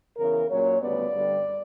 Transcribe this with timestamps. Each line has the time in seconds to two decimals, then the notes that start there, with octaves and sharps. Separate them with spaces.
0.17 E2 C#3 E3 A#4
0.49 A#2 F#3 C#4 C#5
0.81 D2 C#3 G3 B3 D5
1.12 G2 D3 G3